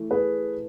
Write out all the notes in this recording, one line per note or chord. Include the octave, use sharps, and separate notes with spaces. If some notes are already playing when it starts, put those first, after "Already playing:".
Already playing: E3 A3
G#4 B4